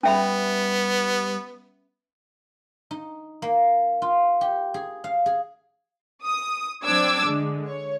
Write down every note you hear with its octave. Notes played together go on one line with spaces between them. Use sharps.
G3 B3 C#4 E5 B5
D#4
A#3
F4
G4
G#4
F5
G#4
D#6
F#3 C4 D4 D6 E6 G#6
D3 G#3
C#5